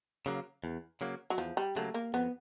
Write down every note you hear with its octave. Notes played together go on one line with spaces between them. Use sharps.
C#3 F#3 A#3
E2
C#3 F#3 A#3
F#3
E2 F3
G3
C#3 F#3 A3 A#3
A#3
F2 B3